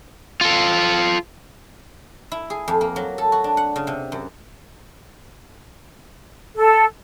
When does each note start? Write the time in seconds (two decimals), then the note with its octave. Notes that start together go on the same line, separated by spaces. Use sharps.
0.41 F4 A4
2.32 E4
2.50 G#4
2.68 F2
2.81 A#3
2.96 F#3
3.18 A4
3.32 F#4
3.44 D4
3.57 F#5
3.76 C#3
3.87 C3
4.12 F#2
6.55 A4